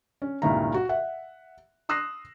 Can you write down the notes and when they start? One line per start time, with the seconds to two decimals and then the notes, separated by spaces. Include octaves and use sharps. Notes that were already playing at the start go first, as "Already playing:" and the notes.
0.22 C#4
0.42 C#2 G2 A#2 D#3 E4 A#5
0.74 F#4
0.89 E5 F#5
1.89 C6 D#6 E6 F#6 A#6 C7